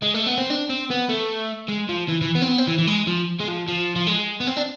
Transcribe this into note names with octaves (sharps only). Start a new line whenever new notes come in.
G#3
A3
B3
C4
D4
C4
B3
A3
G#3
F3
E3
E3
B3
C4
B3
C4
E3
E3
G#3
F3
G#3
F3
F3
F3
G#3
B3
C4
D4